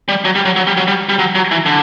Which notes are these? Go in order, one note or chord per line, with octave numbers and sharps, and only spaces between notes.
G3
F#3
G3
F#3
F#3
G3
F#3
G3
G3
F#3
F#3
E3
D3